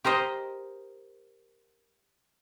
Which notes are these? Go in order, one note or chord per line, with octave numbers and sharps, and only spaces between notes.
G4 A#4 C5 D#5